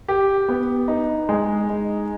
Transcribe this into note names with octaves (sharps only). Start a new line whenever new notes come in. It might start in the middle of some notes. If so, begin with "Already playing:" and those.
G4
B3
D#4
G#3
D#4